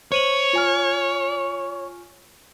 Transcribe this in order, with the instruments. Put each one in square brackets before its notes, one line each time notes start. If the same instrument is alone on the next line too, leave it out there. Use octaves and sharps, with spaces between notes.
[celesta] C5 D#7 F#7 [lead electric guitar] C#5
[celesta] F4 G#5 F6